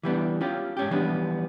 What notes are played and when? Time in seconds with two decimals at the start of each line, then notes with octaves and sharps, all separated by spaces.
0.03 E3 G3 B3 D4
0.41 C#4 F4 G4
0.77 G#2 C#4 G4
0.91 E3 F3 G3 B3 D4